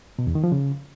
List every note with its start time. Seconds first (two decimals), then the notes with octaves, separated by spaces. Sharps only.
0.19 B2
0.27 E2
0.35 D#3
0.44 F3
0.52 C#3